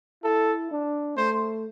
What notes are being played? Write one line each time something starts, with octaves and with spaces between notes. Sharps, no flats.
E4 A4
D4
A3 C5